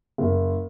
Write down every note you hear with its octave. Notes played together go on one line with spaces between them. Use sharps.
F#1